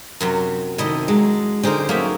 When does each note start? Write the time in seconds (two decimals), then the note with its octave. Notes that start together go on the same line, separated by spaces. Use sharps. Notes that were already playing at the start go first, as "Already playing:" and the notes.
0.21 F#2 C3 F#3
0.78 C3 D#3 E4 A4 D#5
1.08 F#3 G#3
1.63 D3 C4 D#4 G#4 A#4 C5
1.89 F#3 A3 A#3 C#4 D#4 E5